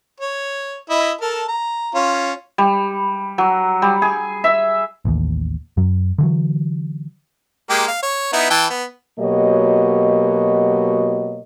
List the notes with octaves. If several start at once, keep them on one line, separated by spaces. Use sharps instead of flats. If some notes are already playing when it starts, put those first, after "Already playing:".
C#5
E4 D#5
A4 A#4 A5
A#5
C#4 F4
G3
F#3
G3
G#4
E5
A1 D#2
F#2 F#3
D3 E3 F#3
G#3 A#3 G4
F5
C#5
B3 D#4 E4
E3 G5 A5
B3
B2 F#3 A#3 G4 C#5 D#5